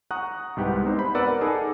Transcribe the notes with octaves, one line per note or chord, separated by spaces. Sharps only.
F#5 A#5 C#6 D#6 F#6
C2 G#2 G4 B4 F#5
B3 C4 D#4 C5
C5 B5
A#4 B4 D5 F#5 A#5 E6
D#4 G#4 A4 D6 D#6